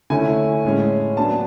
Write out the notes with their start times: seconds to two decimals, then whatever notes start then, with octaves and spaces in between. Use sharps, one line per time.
0.10 D3 A3 C#4 E4 G#5
0.65 A2 G#3 C#4
1.17 F#3 B3 D4 A5